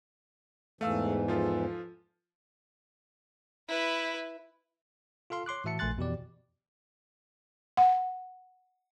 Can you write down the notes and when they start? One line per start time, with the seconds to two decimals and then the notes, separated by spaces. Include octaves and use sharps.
0.81 E2 G#2 E3 A3 F5 E6
1.28 F3 F4 A4
3.68 E4 B4
5.30 F4 A4 F5 C6
5.46 C#5 C6 D6 F#6
5.64 A2 E3 F#4 E5 A5 C#7
5.79 A#1 A3 G#5 C6 F#6 A6
5.97 F2 B2 E3 G4 D5
7.77 F#5